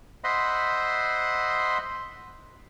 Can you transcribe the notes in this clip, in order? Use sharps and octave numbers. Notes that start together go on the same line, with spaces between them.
C5 D#5 E5 F#5 B5 C6